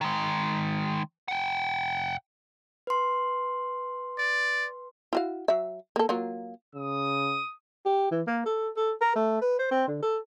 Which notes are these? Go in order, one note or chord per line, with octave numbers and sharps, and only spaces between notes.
D#3 G#3
F#5 G5
B4 C6
D5
E4 F#4 F5
F#3 E5
A#3 A4
F#3 A#3 F4
C#3 D#6
G4
E3
A#3
A4
A4
A#4
A3
B4
C5
C4
D3
A4